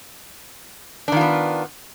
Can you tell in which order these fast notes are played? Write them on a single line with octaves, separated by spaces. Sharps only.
D4 D#3 F4 B3